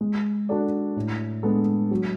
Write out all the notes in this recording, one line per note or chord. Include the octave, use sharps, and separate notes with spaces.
G#3
D4 F#4 A4 D5
A2
G#3 B3 D4 A4
F#3